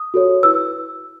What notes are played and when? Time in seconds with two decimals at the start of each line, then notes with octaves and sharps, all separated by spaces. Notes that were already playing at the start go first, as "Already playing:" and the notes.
Already playing: D#6
0.14 F#4 A4 C#5
0.43 E4 B4 E6